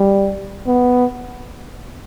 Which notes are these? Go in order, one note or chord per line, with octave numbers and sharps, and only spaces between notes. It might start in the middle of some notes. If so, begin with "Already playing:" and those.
Already playing: G3
B3